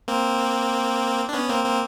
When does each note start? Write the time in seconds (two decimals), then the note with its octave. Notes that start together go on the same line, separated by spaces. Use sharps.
0.08 A#3 C4
1.29 D4
1.33 B3 C#4
1.49 A#3 C4
1.65 A#3 C4